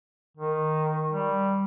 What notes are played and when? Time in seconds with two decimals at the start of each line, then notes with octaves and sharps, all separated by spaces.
0.37 D#3
1.11 G3